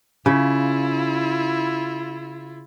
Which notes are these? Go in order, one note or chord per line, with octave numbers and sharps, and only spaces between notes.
C#3 E4 F4